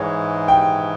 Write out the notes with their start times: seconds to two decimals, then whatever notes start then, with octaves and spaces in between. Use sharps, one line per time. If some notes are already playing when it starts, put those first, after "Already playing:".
Already playing: G#2 E3 G#3 C#5
0.48 G5